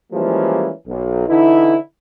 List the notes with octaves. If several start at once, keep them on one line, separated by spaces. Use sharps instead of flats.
E3 F3 G3 G#3 A#3 C#4
B1
D3 E3 D#4 E4